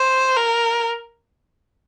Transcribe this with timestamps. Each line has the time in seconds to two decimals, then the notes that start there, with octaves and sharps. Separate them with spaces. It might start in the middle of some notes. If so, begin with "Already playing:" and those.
Already playing: C5
0.37 A#4